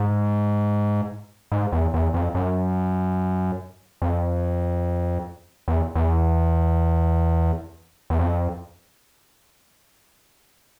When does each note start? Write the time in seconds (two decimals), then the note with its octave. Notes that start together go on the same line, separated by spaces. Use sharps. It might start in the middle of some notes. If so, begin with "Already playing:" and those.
Already playing: G#2
1.52 G#2
1.72 E2
1.94 E2
2.14 F2
2.35 F#2
4.02 F2
5.68 E2
5.95 E2
8.10 E2
8.19 F2